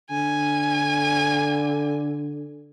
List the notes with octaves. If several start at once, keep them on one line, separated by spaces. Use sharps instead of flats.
D3 G#5